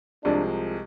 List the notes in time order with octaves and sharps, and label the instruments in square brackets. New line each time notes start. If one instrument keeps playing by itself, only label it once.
[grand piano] C2 C3 F3 G#3 [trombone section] D4